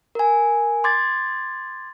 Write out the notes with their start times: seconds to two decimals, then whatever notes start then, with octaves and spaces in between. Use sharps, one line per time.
0.15 A#4 G#5
0.84 C6 D6 G#6 A6